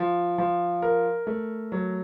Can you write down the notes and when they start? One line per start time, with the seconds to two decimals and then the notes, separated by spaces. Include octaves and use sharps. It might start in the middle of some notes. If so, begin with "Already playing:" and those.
Already playing: F3
0.38 F3
0.82 A#4
1.27 A3
1.72 F#3